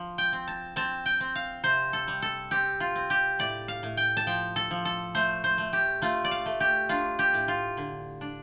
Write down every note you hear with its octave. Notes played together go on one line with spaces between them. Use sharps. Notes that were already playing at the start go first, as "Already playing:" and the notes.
Already playing: F3
G5
C4
A5
C4 A5
G5
C4
F5
C3 C5
A4
G3
A4
C4 G4
F4
C4
G4
A2 D5
F5
A2
G5
A5
F3 G5
A4
F3
A4
A3 C5
C5
A3
G4
A3 F4
D5
F5
A3
G4
D4 F4
G4
A2
F4
D3
D4